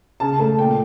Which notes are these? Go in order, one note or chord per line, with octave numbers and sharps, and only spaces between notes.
C#3 A5
A3 A5
A#2 G5